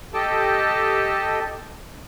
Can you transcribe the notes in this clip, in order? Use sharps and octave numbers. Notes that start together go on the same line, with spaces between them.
G4 A4 D#5 G5 A5